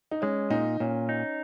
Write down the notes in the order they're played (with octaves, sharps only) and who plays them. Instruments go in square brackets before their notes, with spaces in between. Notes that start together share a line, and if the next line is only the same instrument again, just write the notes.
[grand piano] D#4
[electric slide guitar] G#3 [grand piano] C#4
[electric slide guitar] A#2 [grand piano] D#4
[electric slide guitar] A#2 [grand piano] C#4
[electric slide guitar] D#4